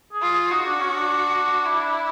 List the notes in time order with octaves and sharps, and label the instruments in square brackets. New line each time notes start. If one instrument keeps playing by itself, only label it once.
[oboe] G#4
[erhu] F4
[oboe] G#4
[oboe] D#4 [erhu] F#4
[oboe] D4
C#4
D4
[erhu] E4